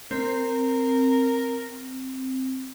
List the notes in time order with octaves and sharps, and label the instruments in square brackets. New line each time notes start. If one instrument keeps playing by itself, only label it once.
[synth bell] C4 [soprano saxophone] A#4